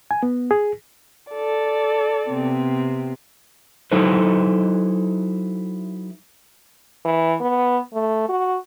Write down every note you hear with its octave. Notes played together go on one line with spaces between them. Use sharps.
G#5
B3
G#4
A4 D5
C3 B3 C4
F#3 D#4 E4 A4 B4 C5
E3
B3
A3
F#4